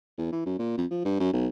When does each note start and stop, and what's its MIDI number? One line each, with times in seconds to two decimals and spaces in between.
0.18 0.30 40
0.32 0.44 52
0.46 0.58 42
0.59 0.73 46
0.77 0.85 41
0.91 1.01 53
1.05 1.15 43
1.20 1.32 42
1.33 1.47 35